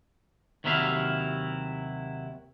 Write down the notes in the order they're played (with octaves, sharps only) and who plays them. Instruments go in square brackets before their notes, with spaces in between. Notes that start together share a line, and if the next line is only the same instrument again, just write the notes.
[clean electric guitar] D#2 C3 F#3 E4 E5 F5